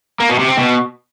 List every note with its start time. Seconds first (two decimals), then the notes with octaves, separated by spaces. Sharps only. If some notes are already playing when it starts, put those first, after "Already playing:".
0.20 A#3
0.29 B2
0.39 C3
0.48 C4
0.58 B2